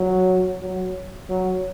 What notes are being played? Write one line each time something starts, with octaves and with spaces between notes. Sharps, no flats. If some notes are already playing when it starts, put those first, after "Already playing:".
Already playing: F#3
F#3
F#3